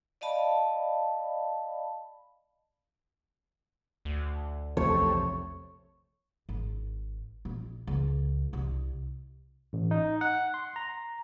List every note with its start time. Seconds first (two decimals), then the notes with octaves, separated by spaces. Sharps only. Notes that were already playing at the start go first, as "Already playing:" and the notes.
0.21 D5 D#5 F5 A5 B5
4.05 D2
4.77 A#1 E2 C3 F3 A3 C#5
6.49 G#1
7.45 A#1
7.87 C#2
8.53 C2
9.73 A1
9.91 D#4
10.21 F#5
10.54 C6
10.76 A#5